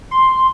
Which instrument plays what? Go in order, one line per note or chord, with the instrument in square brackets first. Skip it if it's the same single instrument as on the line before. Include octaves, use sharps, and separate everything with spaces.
[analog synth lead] C6